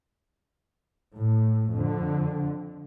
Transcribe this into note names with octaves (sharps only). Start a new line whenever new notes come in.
A2
F2 D3